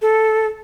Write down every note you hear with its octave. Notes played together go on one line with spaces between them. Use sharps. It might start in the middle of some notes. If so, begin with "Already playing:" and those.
A4